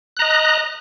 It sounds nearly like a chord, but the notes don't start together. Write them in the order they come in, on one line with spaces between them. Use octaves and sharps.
F#6 A#5 D#5